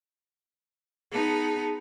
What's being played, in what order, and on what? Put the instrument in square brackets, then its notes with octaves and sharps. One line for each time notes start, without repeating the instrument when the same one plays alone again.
[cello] B3 D#4 [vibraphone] G#4 A5